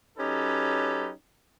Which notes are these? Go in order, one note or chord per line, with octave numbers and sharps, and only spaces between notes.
F#3 C#4 D#4 G4 A4 B4